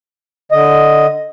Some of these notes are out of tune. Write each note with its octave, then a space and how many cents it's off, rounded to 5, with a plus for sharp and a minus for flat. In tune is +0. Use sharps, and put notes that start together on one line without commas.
D3 +0 D#5 +0